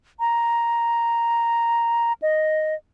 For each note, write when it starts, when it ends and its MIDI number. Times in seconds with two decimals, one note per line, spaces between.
0.20 2.13 82
2.22 2.75 75